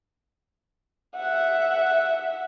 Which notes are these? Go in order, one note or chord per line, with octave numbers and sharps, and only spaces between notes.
E5 F#5